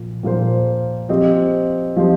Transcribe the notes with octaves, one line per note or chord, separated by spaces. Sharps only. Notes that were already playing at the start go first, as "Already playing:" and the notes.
Already playing: A#2 F3
A#2 F3 A#3 F4 C5
F3 C4 G4 C5 D#5
F3 C4 G4 C5 D#5